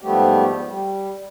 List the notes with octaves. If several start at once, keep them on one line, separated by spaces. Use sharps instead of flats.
G#2 F3 G3 A3 B3 G4
G3